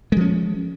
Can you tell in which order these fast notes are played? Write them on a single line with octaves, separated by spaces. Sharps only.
G#3 F3 C#4